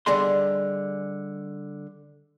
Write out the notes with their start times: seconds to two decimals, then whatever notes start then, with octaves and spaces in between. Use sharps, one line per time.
0.06 D3 G3 D4 G#4 D#5 C6